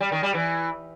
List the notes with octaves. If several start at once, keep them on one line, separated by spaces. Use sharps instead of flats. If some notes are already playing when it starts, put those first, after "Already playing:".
G3
D#3
G3
E3